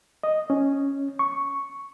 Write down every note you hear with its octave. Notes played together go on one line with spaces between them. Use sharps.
D#5
C#4
C#6